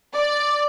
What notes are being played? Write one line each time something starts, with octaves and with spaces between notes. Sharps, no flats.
D5